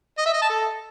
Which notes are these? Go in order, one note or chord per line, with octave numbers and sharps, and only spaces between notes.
D#5
E5
D#5
A5
A4